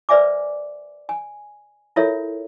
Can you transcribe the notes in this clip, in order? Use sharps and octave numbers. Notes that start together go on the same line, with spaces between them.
B4 C5 D5 E5 G#5 D6
G#5
E4 F4 A4 A#4 C#5 E5